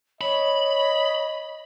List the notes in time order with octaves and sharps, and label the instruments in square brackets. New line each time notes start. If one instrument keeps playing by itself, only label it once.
[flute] C#5 [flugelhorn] D#5 [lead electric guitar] B5